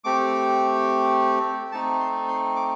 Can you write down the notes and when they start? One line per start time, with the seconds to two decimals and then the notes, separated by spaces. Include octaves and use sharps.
0.04 A3 C4 G4 D6
1.72 A3 C4 D#4 A5
2.00 C6
2.28 C6
2.56 D6